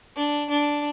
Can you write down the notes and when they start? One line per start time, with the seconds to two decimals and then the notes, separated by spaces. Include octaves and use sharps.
0.16 D4
0.49 D4